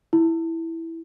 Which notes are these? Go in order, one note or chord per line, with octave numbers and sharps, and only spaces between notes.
E4